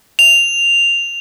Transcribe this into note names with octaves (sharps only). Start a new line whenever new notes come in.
F7